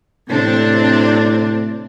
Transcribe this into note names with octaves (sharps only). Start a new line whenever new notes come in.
A2 C3 C4 D4